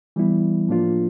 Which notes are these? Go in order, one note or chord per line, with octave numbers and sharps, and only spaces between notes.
E3 G3 B3 E4
A2 F3 A#3 D4 F4